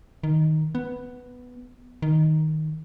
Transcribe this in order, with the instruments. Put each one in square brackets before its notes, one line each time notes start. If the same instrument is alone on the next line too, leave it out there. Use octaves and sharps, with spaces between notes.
[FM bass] D#3
B3
D#3